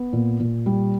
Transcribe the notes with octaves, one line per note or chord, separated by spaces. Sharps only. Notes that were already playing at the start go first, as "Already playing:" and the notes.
Already playing: B3
A#2
A#2
G3